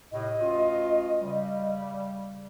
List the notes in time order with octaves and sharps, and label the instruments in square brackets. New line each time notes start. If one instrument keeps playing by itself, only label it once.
[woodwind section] A2 C3 [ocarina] D#5
[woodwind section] D2 C#4 F4
C#3 G3